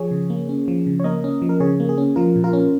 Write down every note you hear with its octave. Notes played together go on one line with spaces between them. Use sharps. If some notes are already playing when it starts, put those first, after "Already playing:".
Already playing: F3 G#4 C#5
C#3
A#3
C#4
F3
C#3
C#5
A#3 A#4 D#5
C#4
F3
A#4
C#3 G#4 C#5
A#3
G#4
C#4
F3 F4 A#4
A#2
F4 A#4
C#4